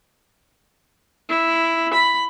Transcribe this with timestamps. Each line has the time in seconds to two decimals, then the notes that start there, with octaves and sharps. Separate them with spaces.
1.29 E4
1.93 B5